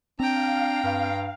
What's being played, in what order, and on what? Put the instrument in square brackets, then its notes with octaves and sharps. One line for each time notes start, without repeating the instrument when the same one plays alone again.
[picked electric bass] C4 [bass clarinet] D4 [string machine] F5 [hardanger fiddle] G5 A#5
[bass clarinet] G2